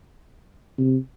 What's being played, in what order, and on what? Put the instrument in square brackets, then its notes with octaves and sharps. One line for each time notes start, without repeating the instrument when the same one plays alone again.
[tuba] C3